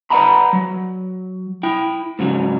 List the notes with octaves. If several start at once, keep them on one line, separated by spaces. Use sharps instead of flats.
B4 D5 F5 F#5 A#5 B5
F#3
E4 G5
G#2 C#3 F#3